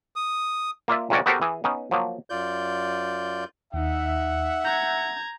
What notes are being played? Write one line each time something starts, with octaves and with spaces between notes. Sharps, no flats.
D#6
A#3 F4 D5 E5
C#2 G2 C3 C#4 F#4 D5
B3 F#4 G4 A4 A#4 C5
E3 G#4
B3 C#4 D#4
F3 F#3 A#3
F#2 F4 D5 G6
D#2 D#4 E5 F#5
A#5 G6 G#6